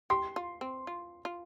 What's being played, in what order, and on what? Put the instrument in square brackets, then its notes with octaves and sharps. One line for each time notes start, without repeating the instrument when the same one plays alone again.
[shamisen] G4 [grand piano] C6
[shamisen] F4
C4
F4
F4